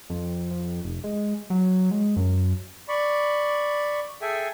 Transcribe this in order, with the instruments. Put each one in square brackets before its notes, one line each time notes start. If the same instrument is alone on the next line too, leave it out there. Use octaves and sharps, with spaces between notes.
[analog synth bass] F2
F2
F1
G#3
F#3
G#3
F#2
[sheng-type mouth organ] D5 B5 C#6
G#4 A4 E5 G5 G#5